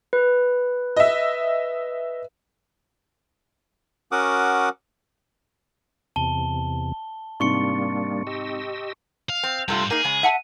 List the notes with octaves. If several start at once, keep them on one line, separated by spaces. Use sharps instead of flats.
B4
D#5 E5
C#4 F#4 A#4 F#5 D6 D#6
E2 C3 A5 G7
G#2 C3 G3 A#3 D4 C6 C#6 C#7
G4 D#5 E6
F5
C4
G2 C3 A3 F4
A#3 D#4 G#4
C#3 G#3
E5 F#5 A5